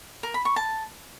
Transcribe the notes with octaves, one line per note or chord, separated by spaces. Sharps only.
A#4
B5
C#6
A5